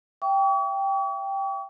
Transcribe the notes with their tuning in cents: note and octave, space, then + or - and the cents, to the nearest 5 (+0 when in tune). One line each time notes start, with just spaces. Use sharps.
E5 +30 G5 +0 C#6 +45